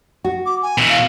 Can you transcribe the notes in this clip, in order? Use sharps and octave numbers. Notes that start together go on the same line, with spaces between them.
F#4
D6
G#5
B2 E3
F5